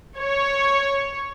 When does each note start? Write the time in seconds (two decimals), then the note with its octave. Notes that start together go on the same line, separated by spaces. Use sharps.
0.19 C#5